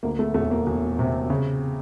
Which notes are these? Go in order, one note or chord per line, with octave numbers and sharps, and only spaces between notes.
D2 A#3
A3
E1 A3
A#3
E1
C3
C#3